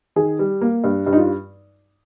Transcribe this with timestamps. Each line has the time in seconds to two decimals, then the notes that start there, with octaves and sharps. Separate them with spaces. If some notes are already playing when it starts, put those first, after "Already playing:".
0.16 D#3 G#4
0.39 G3
0.61 A#3
0.84 G2
1.06 G2
1.13 D#4
1.17 F4